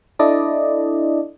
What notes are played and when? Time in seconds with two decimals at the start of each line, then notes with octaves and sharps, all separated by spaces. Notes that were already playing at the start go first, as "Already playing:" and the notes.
0.19 D4 E4 A4 D5 D#5